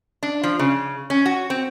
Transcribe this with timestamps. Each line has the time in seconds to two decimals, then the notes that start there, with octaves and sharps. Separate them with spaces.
0.23 D4
0.44 F3
0.59 C#3
1.10 C#4
1.26 F#4
1.50 C4